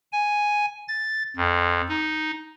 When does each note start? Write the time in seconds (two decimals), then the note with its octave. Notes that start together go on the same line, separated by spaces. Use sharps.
0.12 G#5
0.88 A6
1.37 F2
1.88 D#4